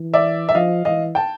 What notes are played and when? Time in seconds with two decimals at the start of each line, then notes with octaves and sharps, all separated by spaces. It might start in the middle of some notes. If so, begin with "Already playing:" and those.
Already playing: E3
0.14 D5 E5
0.49 E5
0.54 F3 D#5 F5
0.85 E3 D#5 F5
1.15 G5 A5